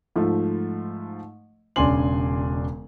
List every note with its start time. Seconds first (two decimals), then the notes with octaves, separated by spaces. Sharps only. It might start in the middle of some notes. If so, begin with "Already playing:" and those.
0.16 G#2 F3 A3
1.76 E1 C#3 D4 G#5 C6 F#7